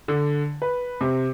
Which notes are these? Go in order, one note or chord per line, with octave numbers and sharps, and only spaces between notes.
D3
B4
C3